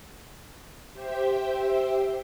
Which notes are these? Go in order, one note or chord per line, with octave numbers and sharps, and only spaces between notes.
G4 C5 E5 G5